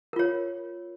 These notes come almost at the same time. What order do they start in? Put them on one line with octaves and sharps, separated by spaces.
A#4 F4 C#5